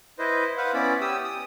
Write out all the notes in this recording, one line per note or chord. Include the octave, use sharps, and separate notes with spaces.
E4 B4 C5 D#5
B4 C5 F5 F#5
B3 C#4 E4 D5 B5
G4 D#6 E6
D#6